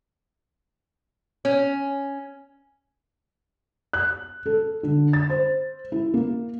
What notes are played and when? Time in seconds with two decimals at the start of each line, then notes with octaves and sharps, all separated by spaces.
1.45 C#4
3.93 F#6
4.46 A4
4.83 D3
5.13 A6
5.30 C5
5.92 E4
6.14 A#3